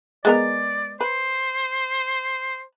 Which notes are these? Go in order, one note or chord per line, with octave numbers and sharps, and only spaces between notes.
G#3 B3 A#4 D5
B4 C5